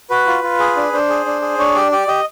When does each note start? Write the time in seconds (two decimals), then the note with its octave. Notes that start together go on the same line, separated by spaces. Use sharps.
0.10 F#4 B4
0.27 F4
0.43 F4
0.59 G#4
0.77 D4
0.93 D4 C5
1.09 G#4
1.26 D4
1.42 G#4
1.58 D4 C#5
1.75 G4 D5
1.91 G4 D5
2.08 G4 D#5